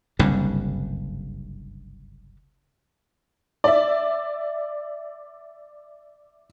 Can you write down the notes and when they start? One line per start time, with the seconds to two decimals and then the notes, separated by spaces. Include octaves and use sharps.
0.19 F#1 C2 G2 D3
3.64 D5 E5